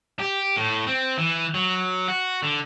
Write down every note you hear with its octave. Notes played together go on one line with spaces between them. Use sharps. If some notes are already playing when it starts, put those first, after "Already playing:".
G4
A2
C4
E3
F#3
F#4
D3